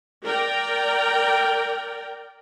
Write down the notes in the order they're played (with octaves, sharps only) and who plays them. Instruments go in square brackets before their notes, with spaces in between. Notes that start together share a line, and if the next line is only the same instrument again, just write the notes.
[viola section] A#4 D5 G5